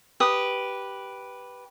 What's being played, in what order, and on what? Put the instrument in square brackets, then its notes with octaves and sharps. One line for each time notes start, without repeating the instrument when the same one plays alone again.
[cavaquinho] G4 B4 D#6